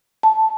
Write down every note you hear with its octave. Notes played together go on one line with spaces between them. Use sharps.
A5